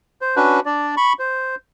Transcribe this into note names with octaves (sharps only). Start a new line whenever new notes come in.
C5
C#4 D4 F#4 B4
D4 D5
B5 C#6
C5